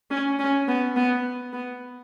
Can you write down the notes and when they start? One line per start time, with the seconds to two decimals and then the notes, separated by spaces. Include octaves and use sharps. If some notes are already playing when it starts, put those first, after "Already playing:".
0.10 C#4
0.39 C#4
0.68 B3
0.96 B3
1.53 B3